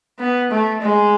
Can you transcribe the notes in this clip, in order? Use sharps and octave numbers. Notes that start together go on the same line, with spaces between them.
B3
A3
G#3